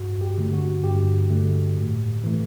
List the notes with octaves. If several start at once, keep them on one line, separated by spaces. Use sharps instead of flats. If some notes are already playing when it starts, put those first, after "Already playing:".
Already playing: G2 F#4
G4
D3 A3
F#4
G2 G4
D3 A3
A2
E3 A3